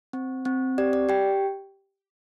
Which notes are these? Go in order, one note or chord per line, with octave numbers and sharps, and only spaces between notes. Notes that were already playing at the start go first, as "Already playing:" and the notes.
C4
C4
G4 D5
D5
G4 G5